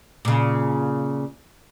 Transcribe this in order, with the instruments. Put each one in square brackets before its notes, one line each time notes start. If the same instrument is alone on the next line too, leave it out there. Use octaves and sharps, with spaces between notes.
[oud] A#2 C#3